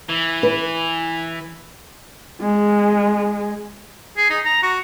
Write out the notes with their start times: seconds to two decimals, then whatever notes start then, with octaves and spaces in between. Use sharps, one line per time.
0.09 E3
0.43 B4
2.41 G#3
4.17 G#4
4.30 D#4
4.45 A#5
4.63 F#4